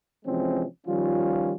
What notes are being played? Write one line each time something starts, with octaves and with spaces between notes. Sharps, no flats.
C3 E3 F3 G#3 C4 C#4
D#3 F3 G3 C#4 F4